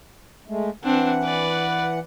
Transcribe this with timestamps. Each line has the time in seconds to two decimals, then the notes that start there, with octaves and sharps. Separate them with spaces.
0.48 G#3 A3
0.84 E3 C4 D4 F#5
1.24 B4 D5